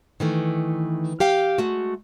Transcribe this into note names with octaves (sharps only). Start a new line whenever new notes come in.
D#3 E3 A3
G4 F5 G5
G#3 A3 F#4